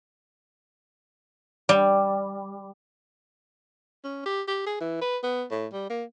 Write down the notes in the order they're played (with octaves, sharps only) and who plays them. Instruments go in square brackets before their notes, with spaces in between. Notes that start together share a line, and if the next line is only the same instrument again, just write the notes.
[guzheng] G3
[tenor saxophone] C#4
G4
G4
G#4
E3
B4
B3
A2
G3
A#3